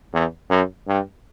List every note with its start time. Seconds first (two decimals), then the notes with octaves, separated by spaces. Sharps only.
0.13 E2
0.50 F#2
0.88 G2